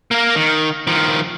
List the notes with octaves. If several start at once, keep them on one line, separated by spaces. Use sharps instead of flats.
A#3 A#4
D#3
D#3 F3